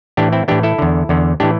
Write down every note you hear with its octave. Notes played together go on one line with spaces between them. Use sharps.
A2 E3 D4 G4
C4 E4
A2 E3 D4 G4
E4 A4
E2 D3
E2 D3
A2 E3 D4 G4